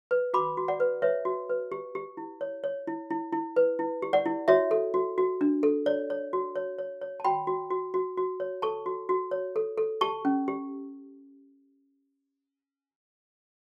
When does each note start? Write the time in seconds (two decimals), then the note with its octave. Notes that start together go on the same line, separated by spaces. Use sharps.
0.11 B4
0.34 F#4 B5 D6
0.57 F#4
0.68 D5 F#5
0.80 B4
1.02 B4 C#5 E5
1.25 F#4
1.49 B4
1.72 G4
1.95 G4
2.17 E4
2.41 C#5
2.64 C#5
2.87 E4
3.10 E4
3.32 E4
3.56 B4
3.79 E4
4.02 G4
4.13 D5 F#5
4.26 E4
4.48 F#4 C#5 E5
4.71 A4
4.94 F#4
5.18 F#4
5.41 D4
5.63 A4
5.86 C#5 D5
6.10 C#5
6.33 F#4
6.56 C#5
6.78 C#5
7.01 C#5
7.20 A5
7.24 F#4 G5 B5
7.47 F#4
7.71 F#4
7.94 F#4
8.17 F#4
8.40 C#5
8.62 A4 A5 C#6
8.86 F#4
9.09 F#4
9.31 C#5
9.56 A4
9.77 A4
10.01 G4 A5 C#6
10.25 C#4
10.48 G4